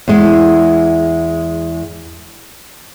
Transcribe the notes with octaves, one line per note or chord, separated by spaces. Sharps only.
E2 G#3